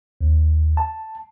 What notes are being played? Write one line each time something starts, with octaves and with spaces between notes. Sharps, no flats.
D#2
A5